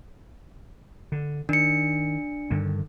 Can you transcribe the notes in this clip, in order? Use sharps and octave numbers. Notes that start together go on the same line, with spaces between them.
D3
D#3 D4 C#7
G2 D3 D#3